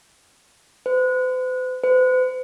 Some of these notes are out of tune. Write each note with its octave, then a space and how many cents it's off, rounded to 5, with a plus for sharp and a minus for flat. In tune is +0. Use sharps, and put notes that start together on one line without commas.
C5 -45
C5 -45